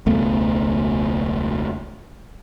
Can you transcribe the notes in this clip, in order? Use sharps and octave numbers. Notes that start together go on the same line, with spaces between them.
E1 C#2 A3 B3